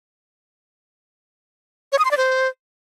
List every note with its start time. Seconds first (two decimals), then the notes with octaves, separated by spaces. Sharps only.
1.92 C#5
1.99 D#6
2.05 C6
2.11 D5
2.17 C5